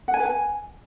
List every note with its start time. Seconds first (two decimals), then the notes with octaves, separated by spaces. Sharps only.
0.08 F#5
0.14 G#5
0.20 B4
0.25 G#5